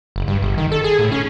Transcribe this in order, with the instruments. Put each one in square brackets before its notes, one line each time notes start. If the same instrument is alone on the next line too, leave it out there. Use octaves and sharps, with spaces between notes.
[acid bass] F#1
G2
G1
D#3
A4
G#4
A2
C#4